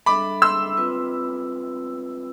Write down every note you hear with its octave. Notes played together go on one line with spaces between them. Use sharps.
G3 D4 A4 E5 B5 D6
C6 E6
C4 F4 B4